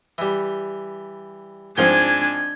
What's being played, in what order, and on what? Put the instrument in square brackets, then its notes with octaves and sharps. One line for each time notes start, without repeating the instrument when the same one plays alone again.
[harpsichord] E3 G3
[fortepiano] G#2 F3 C4 [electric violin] D4 G#5 [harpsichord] G5 [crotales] G#6